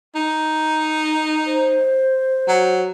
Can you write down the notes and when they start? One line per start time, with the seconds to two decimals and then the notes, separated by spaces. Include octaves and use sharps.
0.15 D#4
1.47 C5
2.48 F#3